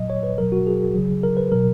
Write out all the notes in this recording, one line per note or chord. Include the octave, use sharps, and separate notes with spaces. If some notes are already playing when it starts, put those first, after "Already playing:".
Already playing: A#2 F#3 D#5
C#5
B4
B2 F#3 A#4
F#4
G#4
C#3 F#3
A#4
B4
B2 F#3 A#4